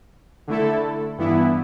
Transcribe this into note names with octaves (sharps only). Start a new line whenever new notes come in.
D3 A3 E4 A4
G2 E3 B3 E4